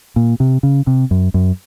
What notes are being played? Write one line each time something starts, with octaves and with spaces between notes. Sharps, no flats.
A#2
C3
C#3
C3
F#2
F#2